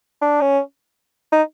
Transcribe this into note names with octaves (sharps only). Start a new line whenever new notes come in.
D4
C#4
D#4